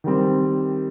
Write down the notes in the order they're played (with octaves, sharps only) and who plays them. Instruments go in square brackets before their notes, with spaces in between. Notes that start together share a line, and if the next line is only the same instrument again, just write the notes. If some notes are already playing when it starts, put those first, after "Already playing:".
[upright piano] D#3 G3 C4